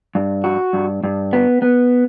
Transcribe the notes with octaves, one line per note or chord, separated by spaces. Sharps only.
G2
F#4
G2
G2
B3
B3